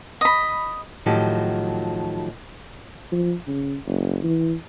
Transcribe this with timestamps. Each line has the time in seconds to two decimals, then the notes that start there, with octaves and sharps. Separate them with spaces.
0.21 D#5 B5
1.06 A2 D#3 F3 F#3 E4 G4
3.12 F3
3.47 C#3
3.87 F#1
4.24 E3